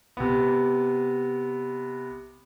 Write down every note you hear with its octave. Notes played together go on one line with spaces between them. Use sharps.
C3 B3